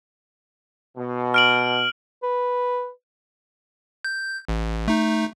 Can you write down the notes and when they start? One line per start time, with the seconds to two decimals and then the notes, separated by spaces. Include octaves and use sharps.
0.96 B2
1.34 F6 D7 F#7
2.23 B4
4.05 G6
4.49 A1
4.88 A3 D#4